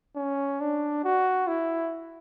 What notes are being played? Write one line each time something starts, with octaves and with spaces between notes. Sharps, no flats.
C#4
D4
F#4
E4